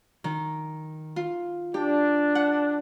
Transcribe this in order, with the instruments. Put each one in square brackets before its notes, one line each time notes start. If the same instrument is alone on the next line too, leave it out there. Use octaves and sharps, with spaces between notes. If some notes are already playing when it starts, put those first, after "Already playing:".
[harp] D#3
F4
[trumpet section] D4 [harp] G4
[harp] F#5